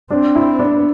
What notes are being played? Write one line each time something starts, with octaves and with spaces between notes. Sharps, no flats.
C4 D4
E4
B3 D4